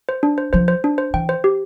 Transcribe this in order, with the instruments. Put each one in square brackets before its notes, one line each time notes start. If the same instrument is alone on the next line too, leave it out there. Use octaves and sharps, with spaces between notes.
[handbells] C5
D4
C5
[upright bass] F3 [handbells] C5
[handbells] C5
D4
C5
[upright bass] E3 [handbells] G5
[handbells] C5
G4